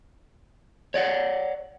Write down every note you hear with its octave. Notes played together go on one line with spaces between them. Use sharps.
C#5 D5 F#5